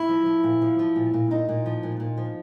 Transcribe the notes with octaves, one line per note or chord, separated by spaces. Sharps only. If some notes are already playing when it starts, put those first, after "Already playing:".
Already playing: E4
F3
F3
A#2
F3
F3
A#2
A#2
A#2 D#4
A#2
F3
A#2
A#2
F3